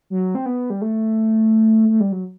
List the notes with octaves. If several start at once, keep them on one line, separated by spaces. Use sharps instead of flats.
F#3
C4
B3
G3
A3
A3
G3
F#3